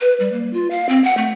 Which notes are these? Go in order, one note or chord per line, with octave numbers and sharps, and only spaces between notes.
B4
G3
A#3
F4
F5
C4
F#5
A3